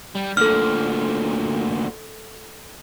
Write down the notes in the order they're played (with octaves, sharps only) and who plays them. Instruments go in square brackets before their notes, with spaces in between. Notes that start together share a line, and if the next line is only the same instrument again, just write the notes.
[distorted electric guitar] G3
[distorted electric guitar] D2 A#2 [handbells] A4 F6